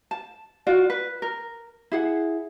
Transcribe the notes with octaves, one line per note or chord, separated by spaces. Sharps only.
A5
F4 F#4 D5
B4
A#4
E4 G#4 F#5